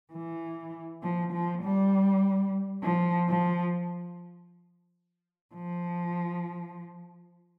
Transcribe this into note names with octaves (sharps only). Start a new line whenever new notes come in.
E3
F3
F3
G3
F3
F3
F3